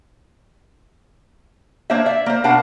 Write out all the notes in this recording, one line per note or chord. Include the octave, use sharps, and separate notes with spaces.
A#3 D4 C5 C#5 E5
D5 E5
A#3 C5
B2 D4 A#4 F5 F#5 A5